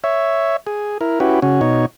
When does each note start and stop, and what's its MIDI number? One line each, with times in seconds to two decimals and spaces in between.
0.04 0.56 73
0.04 0.56 76
0.67 0.98 68
1.01 1.19 64
1.01 1.19 70
1.20 1.40 61
1.20 1.40 64
1.20 1.40 66
1.20 1.40 67
1.20 1.40 71
1.42 1.61 49
1.42 1.61 61
1.42 1.61 66
1.61 1.86 47
1.61 1.86 63
1.61 1.86 73